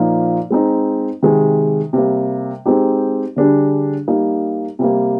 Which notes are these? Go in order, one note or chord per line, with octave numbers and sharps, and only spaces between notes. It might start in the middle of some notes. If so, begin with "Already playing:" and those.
Already playing: A#2 F3 A#3 D#4
G#3 C4 D#4
C3 D#3 G#3
C3 G3 A#3
G#3 C4 D#4 G4
D3 G3 D4 G#4
G3 A#3 D#4
C3 G3 A#3